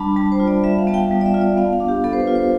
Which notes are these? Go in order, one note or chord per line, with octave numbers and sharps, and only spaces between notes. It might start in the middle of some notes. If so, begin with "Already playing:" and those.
Already playing: G3 D4 A5 B5
G3 A5
C5
F4
D5
G3 E5
F5
B3 A5
G5
G3
D5
E5
F4
D5
B3 F5
F5
D4
G4
B3 A4
C5
B4
F4
C5